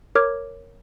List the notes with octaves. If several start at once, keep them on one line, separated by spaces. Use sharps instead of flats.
A#4 C#5 D6 F6 G#6